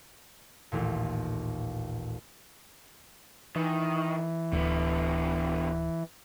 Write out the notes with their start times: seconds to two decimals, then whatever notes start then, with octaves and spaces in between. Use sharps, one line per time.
0.72 A1 D#2 A#2
3.56 D#3 E3
4.53 D1 D3 B3